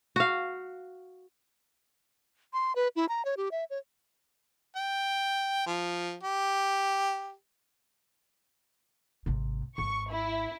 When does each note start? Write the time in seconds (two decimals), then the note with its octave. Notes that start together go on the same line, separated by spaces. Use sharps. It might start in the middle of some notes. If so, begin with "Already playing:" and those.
0.16 F#4 F5
2.53 C6
2.76 B4
2.96 E4
3.09 A#5
3.25 C#5
3.37 G4
3.51 E5
3.70 C#5
4.76 G5
5.66 F3
6.23 G4
9.26 G#1 C3
9.78 G#1 C#6
10.12 E4